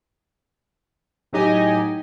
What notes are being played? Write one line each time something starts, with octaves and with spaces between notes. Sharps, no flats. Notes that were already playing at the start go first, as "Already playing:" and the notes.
A2 F#3 D#4 G4 D#5 G#5